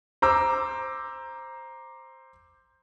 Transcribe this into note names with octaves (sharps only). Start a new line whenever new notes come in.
C5 A#5 D6 E6